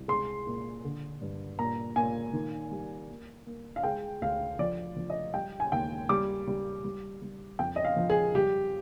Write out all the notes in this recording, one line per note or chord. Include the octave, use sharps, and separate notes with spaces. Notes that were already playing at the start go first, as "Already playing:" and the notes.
Already playing: C2
G#3 C6
A#2
D3
G2
A#2 A#5
A#2 G#5
D#3
G3
A#3
A#3
F5
G#3 G5
D2 F5
F3 D5
F3
D#5
G3 G5
G#5
D#2 G5
G3 D6
G3
G3
G3
F2 G5
D#5
F5
F3
G#4
G3 G4